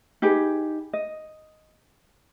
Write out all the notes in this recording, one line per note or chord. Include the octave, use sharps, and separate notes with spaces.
D#4 G4 G#4 B4
D#5